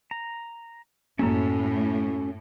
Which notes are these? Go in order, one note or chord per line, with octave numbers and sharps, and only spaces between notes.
A#5
F#2 A2 A#3 C#4 F#4 A4